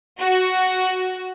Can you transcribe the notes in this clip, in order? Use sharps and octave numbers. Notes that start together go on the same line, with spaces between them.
F#4